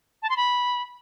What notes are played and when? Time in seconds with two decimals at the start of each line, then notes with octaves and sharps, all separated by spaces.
0.22 A5
0.30 C6
0.37 B5